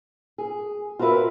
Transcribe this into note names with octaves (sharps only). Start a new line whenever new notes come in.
G#4
F4 F#4 A#4 B4 E5